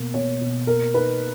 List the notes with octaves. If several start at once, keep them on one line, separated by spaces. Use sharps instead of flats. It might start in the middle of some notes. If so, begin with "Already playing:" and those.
Already playing: B2 A#3
B2 C#5
B2
A#3 A#4
D#4 B4